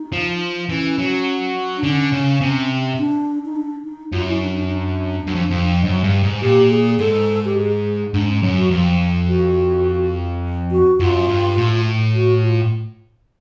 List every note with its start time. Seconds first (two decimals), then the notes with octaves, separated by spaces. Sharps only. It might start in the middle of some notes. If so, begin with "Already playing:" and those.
Already playing: D#4
0.12 F3
0.69 E3 C#4
0.99 F#3
1.77 D4
1.83 D3 C#4
2.13 C#3
2.41 C3
2.99 D4
3.45 D#4
3.56 D4
3.85 D#4
4.12 F#2 F4
4.28 E4
4.42 D4
4.56 D4
4.70 D4
5.27 F#2
5.35 F2
5.51 F2
5.84 F#2
6.04 G2
6.23 G#2
6.42 A#2 G4
6.70 G#4
7.00 G#2 A4
7.45 G4
7.57 G#4
8.13 G#2 D4
8.28 C#4
8.42 F#2 C#4
8.57 F#4
8.71 F2
9.28 F#4
10.71 F#4
11.00 F#2 F4
11.29 G2
11.58 A2
12.14 F#4
12.43 F4